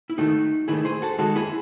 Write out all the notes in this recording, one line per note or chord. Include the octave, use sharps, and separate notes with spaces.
E4
D#3 A3 D#4 F#4
D#3 A3 E4 G#4
G#4 C5
F#4 A4
D#3 G#3 F#4 A4
E4 G#4